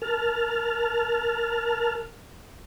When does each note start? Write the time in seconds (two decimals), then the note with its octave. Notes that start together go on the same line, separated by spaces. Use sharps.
0.02 A#4 A5 F6